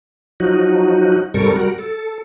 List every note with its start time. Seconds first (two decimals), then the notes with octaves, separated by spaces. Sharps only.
0.40 F3 F#3 D#4 F#4
1.34 G#2 C3 G3 A4 A#4 C#6
1.56 G3 F#4 A#4
1.78 A4